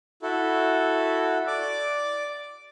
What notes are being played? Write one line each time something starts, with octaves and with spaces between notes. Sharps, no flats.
E4 F#4 A4
D5 D6